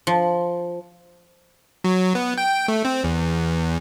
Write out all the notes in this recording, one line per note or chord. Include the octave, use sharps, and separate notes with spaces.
F3
F#3
B3
G5
A3
C4
E2